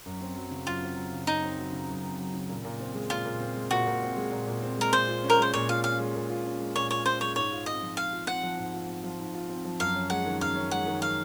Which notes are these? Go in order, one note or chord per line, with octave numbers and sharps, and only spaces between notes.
F#2
C4
F#3
C#3
F#2 F4
C4
F#3
C#3
F#2 D#4
C4
F#3
C#3
F#2
C4
F#3
C#3
A#2
A#2
C4
G#3
A#2 F4
A#2
C4
G#3
A#2 F#4
A#2
C4
G#3
A#2
A#2
C4
G#3 A#4
A#2 C5
F4
C#4
A#4
G#3 C5
A#2 C#5
F4 F5
C#4 F5
G#3
A#2
F4
C#4
G#3
A#2 C#5
F4 C#5
C#4 C5
G#3 C#5
G#2 C#5
F4
C4 D#5
F3
G#2 F5
F4
C4 F#5
F3
G#2
F4
C4
F3
G#2
F4
C4
F3
F#2 F5
C#4
G#3 F#5
D#3
F#2 F5
C#4
G#3 F#5
D#3
F5